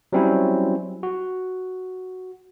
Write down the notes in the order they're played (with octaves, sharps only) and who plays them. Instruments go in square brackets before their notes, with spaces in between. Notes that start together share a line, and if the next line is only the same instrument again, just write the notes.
[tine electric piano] F#3 G3 C4 C#4 E4
F#4